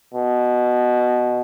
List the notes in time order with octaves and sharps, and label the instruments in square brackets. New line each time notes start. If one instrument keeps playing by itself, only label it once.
[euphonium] B2